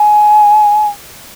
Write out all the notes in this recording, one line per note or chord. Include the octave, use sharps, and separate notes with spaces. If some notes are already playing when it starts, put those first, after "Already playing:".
Already playing: G#5